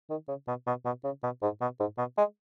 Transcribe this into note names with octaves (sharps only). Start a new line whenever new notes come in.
D#3
C#3
B2
B2
B2
C#3
B2
G#2
B2
G#2
B2
G#3